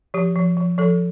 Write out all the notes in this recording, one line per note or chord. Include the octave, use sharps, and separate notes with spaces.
F3 G4
F3
F3
F3 A4